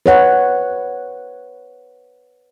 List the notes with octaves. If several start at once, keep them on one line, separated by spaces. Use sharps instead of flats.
B4 C#5 F#5